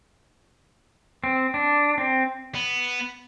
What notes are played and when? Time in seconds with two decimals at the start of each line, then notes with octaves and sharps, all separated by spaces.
1.24 C4
1.54 D4
1.98 C4
2.55 B3